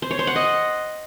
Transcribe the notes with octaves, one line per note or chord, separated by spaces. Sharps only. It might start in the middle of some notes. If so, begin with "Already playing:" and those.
C5
C#5
C5
F#5
D#5